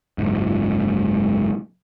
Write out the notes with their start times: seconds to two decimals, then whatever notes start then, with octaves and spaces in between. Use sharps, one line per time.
0.18 F#1 C#2 G#2